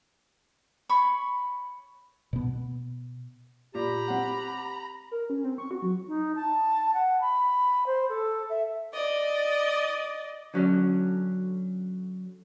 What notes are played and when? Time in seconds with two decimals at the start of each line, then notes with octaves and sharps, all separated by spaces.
0.89 C#5 B5 C#6
2.33 B2 B3
3.74 A#2 G4 A#5 B5
4.08 C4 F#5
5.11 A#4
5.30 C#4
5.44 C4
5.58 C#6
5.71 F#4
5.82 F#3
6.08 D#4
6.36 A5
6.94 F#5
7.21 B5
7.87 C5
8.09 A4
8.50 E5
8.93 D5 D#5
10.54 D3 F#3 C#4